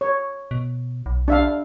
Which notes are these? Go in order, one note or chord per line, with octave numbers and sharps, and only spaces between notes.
C#5
B2
B1
D4 E5 F5